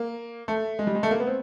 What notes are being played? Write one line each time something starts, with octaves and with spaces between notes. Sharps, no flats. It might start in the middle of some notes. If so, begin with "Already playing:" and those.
Already playing: A#3
A3
G#3
G3
G#3
A3
A#3
B3
C4